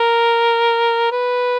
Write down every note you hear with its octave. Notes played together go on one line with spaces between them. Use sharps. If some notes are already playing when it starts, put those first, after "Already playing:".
Already playing: A#4
B4